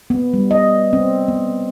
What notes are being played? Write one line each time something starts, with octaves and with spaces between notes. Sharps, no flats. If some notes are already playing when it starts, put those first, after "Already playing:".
B3
G3
D#5
C4
B3